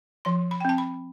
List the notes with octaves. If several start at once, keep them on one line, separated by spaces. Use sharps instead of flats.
F3 C6
B5
G5
C4 A5
B5